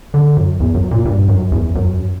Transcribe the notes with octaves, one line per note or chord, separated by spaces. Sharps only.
D3
F#2
E2
F#2
A#2
G2
F#2
E2
F#2